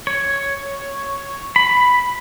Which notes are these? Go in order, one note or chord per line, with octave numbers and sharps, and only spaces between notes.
C#5
B5